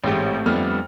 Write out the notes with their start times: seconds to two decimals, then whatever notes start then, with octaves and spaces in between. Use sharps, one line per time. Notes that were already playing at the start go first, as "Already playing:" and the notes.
0.04 A1 G#2 A3 C4 G4
0.46 F2 G3 A3 B3 D4 F6